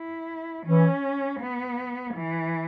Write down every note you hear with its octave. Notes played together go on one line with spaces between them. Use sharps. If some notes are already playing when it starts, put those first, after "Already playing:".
Already playing: E4
E3 C#4
B3
E3